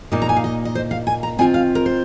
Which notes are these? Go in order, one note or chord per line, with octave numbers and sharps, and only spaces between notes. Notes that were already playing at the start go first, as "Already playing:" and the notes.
A#2 A#3 D#4 D#5
A#5
G#5
F5
D#5
D#5
C5
F5
G#5
A#5
D#3 C4 F4 G#5
F5
A#4
C5